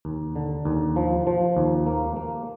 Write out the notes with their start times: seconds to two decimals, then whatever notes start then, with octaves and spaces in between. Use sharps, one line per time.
0.05 D#2
0.36 D3
0.65 D#2
0.96 F3
1.27 F3
1.57 D#2
1.86 A#3
2.16 A#3